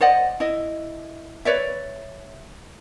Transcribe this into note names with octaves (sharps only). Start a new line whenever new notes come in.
C5 D5 D#5 F#5
E4 D#5
B4 C#5 D5 E5